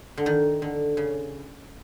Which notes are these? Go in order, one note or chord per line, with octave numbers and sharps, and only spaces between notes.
D3
D#3
D3
C#3